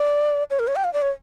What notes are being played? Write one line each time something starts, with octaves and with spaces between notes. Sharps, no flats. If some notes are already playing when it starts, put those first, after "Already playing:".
Already playing: D5
C#5
A#4
C#5
G5
F5
D5
C#5